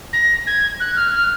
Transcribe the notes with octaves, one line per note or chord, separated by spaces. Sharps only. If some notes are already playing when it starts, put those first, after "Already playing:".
A#6
G#6
F#6
F6
F6